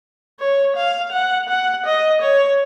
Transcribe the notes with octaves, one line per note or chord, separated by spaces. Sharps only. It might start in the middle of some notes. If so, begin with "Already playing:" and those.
C#5
F5
F#5
F#5
D#5
C#5